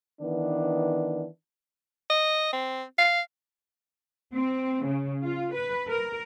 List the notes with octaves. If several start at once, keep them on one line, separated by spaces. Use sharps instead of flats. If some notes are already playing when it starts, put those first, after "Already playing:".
D#3 E3 B3 D4
D#5
C4
F5
C4
C#3
F4
B4
A#4